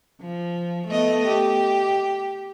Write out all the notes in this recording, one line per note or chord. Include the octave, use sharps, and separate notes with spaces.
F3
A3 B3 D#5
G4